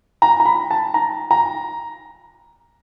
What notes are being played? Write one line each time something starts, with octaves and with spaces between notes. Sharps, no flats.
A#5
A#5
B5
A5
A#5
A#5